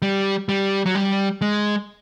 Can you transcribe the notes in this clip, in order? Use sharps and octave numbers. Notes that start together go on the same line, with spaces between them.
G3
G3
F#3
G3
G#3